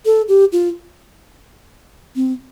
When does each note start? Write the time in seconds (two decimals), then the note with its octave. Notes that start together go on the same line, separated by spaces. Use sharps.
0.06 A4
0.28 G4
0.52 F4
2.16 C4